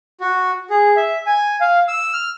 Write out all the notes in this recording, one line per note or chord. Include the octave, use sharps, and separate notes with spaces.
F#4
G#4
E5
G#5
F5
E6
F6